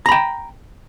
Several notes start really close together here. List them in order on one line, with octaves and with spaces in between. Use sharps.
A#5 B5 G5